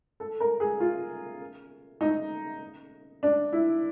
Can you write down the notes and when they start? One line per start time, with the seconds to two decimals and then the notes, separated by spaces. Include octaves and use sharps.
0.20 A4
0.40 A#4
0.60 G#4
0.80 F4
2.01 D#4
3.23 D4
3.53 E4